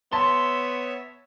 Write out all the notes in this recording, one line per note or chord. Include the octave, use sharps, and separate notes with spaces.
B3 C#5 E5 A5 C6